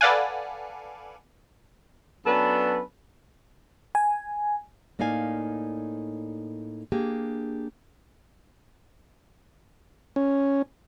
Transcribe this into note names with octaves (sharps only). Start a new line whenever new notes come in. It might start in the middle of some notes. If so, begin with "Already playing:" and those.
A4 B4 D5 F5 F#5 G#5
F#3 B3 C#4 D4 A4 B4
G#5
A2 A#3 D#4 D5 F5 G#5
A#3 D4 G4 G#4
C#4